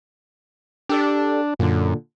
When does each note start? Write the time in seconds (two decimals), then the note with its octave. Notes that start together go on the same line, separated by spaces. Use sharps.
0.89 D4 G4 A4 D5
1.59 F#2 A#2 D3